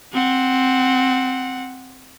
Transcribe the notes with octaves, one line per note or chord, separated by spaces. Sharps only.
C4 F#5